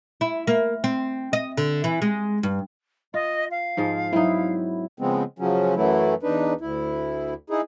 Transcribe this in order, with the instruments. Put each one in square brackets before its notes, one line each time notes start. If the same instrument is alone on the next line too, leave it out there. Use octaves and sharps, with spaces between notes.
[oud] E4
A#3
C4
D#5
D3
E3
G#3
G2
[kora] F4 [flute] D#5
[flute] F5
[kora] G#2 F3 G#3
[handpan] F#3 E4 [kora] C4 D#4
[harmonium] C#3 F3 G#3 B3 C4
C#3 F3 F#3 C#4
F#2 E3 F#3 A3 E4
E2 D4 D#4 B4
D2 E4
D#4 E4 G#4